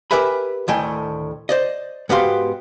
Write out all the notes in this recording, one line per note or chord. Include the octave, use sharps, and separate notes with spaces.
G4 A#4 B4 E5 G#5 B5
D2 A2 D#3 A3 G5 G#5
C5 D5 D#5
G#2 B3 F#4 G4 F5 C6